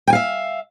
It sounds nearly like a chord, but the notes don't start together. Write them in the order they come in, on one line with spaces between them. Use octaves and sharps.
G5 G#5 F5 E5